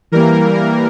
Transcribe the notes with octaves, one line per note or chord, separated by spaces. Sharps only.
E3 G3 A#3 A#4
A#4